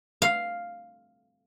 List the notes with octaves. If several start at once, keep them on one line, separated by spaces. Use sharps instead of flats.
F5